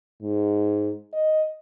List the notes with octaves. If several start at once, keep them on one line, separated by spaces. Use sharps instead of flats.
G#2
D#5